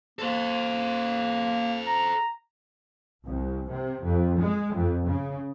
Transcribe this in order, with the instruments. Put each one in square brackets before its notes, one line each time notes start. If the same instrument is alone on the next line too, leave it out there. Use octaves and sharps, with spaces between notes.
[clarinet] A#3 [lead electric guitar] A4 C5
[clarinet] A#5
[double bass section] C2
C3
F2
G#3
F2
C#3